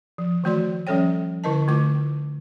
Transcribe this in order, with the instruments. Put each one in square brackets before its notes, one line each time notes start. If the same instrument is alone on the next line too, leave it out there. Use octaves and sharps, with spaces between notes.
[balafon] F3
D#3 E3 A3 F#4 D5 C6
F3 G3 C#4 A4 C#5 G5
D3 E4 A#4 D#5 A5
D3 A3 F4 D6